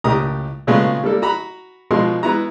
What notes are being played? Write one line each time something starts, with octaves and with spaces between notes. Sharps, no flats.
C#2 A2 G4 A#4 A#5 D#6
A#2 C#3 F#3 G#3 A3 B3
G3 A#3 A4
F#4 A#5 B5
B2 F3 G#3 A#4 C6
G#3 B3 E4 F#4 A#5